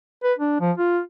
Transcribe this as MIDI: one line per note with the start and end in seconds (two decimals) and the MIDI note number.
0.23 0.33 71
0.38 0.56 62
0.60 0.72 53
0.78 1.00 65